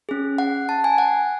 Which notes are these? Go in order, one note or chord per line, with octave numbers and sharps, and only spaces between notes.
C#4 G#4
F#5
A5
G#5
F#5